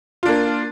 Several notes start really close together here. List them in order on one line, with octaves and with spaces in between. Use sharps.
F4 D4 A#3